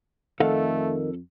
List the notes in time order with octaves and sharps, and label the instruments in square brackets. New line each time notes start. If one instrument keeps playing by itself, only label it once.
[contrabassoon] F2 [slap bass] D#3 [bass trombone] A3 [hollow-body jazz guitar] A4 F5 F#5